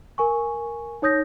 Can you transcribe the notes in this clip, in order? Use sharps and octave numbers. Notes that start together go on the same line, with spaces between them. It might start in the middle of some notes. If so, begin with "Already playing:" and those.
A#4 G#5 C#6
D#4 C#5 D#6 G6 A#6